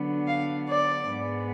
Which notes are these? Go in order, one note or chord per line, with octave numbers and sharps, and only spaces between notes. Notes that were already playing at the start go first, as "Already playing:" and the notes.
Already playing: D3 F#3 B3 D4
F5
D5
G#2 G#3 B3